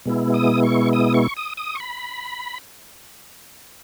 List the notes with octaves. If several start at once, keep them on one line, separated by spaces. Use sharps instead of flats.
B2 G#3 B3 E4
D#6
C#6
D#6
C#6
D#6
D#6
C#6
B5